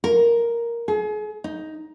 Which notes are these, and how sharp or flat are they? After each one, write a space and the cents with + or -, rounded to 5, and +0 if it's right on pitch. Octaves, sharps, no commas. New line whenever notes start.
A#4 +5
G#4 +35
D#4 +10